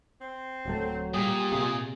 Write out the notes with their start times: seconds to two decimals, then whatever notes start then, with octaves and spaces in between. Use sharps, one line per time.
0.21 C4
0.65 D1 F#3 A3
1.14 A#2 G3 G4 G#4
1.52 C3 G#4